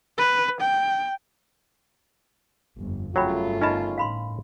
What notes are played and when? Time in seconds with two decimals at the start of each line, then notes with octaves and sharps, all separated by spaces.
0.18 B4
0.61 G5
2.80 G1 F2
3.16 G1 C#3 F#3 A3 F4 C#5 G5 B5
3.61 C#4 D#4 A#4 D#5 A5 B5
3.98 A2 F5 B5 C6